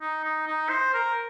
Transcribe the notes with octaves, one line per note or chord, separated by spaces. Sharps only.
D#4
D#4
D#4
C5
A#4